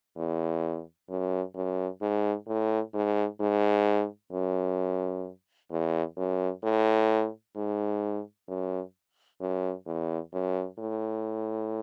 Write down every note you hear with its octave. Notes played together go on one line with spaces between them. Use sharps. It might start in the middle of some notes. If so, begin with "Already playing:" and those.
E2
F#2
F#2
G#2
A2
G#2
G#2
F#2
E2
F#2
A2
G#2
F#2
F#2
E2
F#2
A2